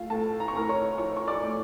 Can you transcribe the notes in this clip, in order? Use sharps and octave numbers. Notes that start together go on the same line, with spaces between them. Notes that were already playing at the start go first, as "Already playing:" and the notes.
Already playing: A3 F4 F5
A2 A4 A5
A#5
C#6
A2 A#4 A#5
C#5 C#6
F3 C#5 C#6
C#6
D5 D6
A3